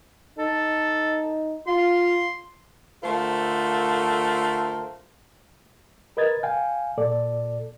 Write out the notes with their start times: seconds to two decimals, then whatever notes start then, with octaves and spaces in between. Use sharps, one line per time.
0.38 D#4 A4
1.67 F4 C6
3.03 D3 A3 F4 A4 A#4 C5
6.17 A#4 B4 D#5 G#6 A6
6.43 F5 G5 G#5
6.98 A#2 A4 D5